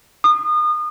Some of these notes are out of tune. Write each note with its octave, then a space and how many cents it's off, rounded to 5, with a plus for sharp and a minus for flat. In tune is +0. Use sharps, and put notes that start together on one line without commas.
D#6 -30